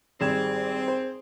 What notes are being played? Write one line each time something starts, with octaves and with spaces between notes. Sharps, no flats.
G#1 G3 C4 G#4 G#6 E7
C5